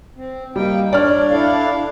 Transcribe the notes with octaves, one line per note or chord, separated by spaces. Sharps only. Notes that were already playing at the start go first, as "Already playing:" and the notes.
C4
G3 A#3 D#4 G5
D4 C#5 D5 F6
E4 A4 F5